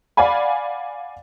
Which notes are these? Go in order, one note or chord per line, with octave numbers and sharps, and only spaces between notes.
D5 F5 F#5 G#5 B5